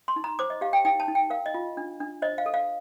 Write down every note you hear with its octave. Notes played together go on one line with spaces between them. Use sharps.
C6
D#4
A#5
C5 D6
D#5
G4 F5
G5
D#4 G5
A5
D#4
G5
A#4 F5
D#5
F4
D4
D4
C5 D#5
F5
A4
F5